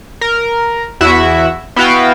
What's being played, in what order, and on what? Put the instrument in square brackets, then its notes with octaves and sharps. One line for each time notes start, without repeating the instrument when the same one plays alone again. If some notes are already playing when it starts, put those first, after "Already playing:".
[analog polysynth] A#4
E2 E4 F#4 E5
B3 E4 F#4 F5 G5